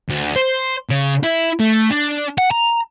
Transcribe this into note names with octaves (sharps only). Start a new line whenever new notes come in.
D2
C5
C#3
E4
A3
D4
F#5
A#5